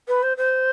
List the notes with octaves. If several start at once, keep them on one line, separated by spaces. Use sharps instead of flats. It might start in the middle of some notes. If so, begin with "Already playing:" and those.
B4
C5
C5